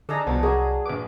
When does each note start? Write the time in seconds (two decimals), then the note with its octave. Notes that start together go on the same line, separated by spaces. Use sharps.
0.09 D3 D4 D#4 G#4 A4 A#5
0.27 C2 B2 F3 G3 B3
0.43 F#3 D4 G#4 A#4 D#5
0.86 A#1 B4 D6